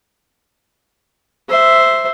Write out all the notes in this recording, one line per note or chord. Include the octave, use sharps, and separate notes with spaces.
C5 E5